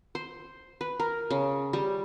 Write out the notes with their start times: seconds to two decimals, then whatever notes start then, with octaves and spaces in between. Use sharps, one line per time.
0.15 C5
0.81 B4
1.00 A#4
1.30 C#3
1.73 G3